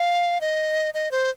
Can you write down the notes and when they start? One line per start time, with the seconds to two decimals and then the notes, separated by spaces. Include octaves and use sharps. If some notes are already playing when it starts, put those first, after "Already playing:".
Already playing: F5
0.41 D#5
0.94 D#5
1.11 C5